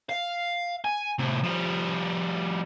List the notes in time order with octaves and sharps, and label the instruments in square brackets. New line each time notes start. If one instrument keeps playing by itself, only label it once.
[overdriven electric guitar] F5
G#5
A2 C3
F3 G3